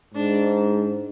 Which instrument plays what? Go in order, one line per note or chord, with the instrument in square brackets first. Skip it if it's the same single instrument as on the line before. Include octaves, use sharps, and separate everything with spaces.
[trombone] G#2 [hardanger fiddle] D4